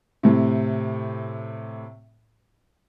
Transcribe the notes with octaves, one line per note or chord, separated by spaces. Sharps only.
A2 C3